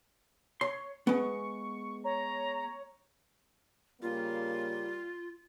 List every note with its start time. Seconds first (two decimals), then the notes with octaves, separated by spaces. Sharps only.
0.61 C#5 C6
1.07 G#3 B3 C#6
2.05 C#5 A#5
4.02 C#3 G3 A#3 F4